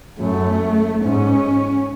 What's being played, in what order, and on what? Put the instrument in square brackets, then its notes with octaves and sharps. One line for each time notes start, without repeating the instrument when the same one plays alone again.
[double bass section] F#2 [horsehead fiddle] A3
[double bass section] G#2 [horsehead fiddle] C#4